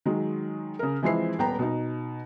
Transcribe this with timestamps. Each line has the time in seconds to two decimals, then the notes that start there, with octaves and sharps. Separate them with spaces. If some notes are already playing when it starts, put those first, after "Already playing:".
0.06 D#3 F#3 G#3
0.79 C#3 A#4
1.03 E3 F3 G#3 C4 E4 C7
1.38 D#1 B3 G5 A#5
1.59 B2 D#4